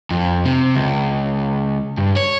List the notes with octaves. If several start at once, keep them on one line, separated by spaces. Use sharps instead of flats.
F2
C3
C#2
G2
C#5